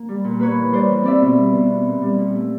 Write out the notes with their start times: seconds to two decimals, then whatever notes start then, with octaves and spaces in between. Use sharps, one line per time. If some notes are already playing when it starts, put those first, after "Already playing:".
Already playing: A#3
0.09 G3
0.24 A#2
0.39 A#3 B4 C#5
0.57 E3
0.72 G3 C5 D5
0.90 E3
1.03 C4 D5 E5
1.22 B2
1.37 G3
1.54 B2
1.70 B3
1.86 A#2
2.02 G3
2.18 A#2
2.34 A3